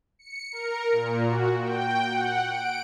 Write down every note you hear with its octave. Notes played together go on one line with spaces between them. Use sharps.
C#7
A#4
A#2
F#4
G5
F#5
D7